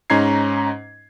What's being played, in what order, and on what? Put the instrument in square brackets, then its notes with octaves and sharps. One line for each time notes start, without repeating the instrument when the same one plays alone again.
[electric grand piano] G#2 C#4 D#4 A#5 G#6 C7